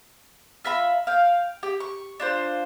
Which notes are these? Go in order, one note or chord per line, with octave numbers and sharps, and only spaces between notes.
F4 E5 A#5 B5
F5 G5
G4
C#6
D4 F4 C5